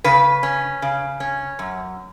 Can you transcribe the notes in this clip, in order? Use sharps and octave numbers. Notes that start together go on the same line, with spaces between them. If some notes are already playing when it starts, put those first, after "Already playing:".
C#3 B4
C#4
C#3
C#4
F#2